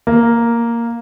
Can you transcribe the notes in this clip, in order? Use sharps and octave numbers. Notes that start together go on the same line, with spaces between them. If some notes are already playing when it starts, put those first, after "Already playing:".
A#3